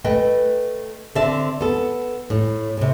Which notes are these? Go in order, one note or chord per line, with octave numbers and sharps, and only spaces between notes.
A3 B4 D#5 G5
D3 C4 D4 E5 A5
B3 A4
A2
A2 C3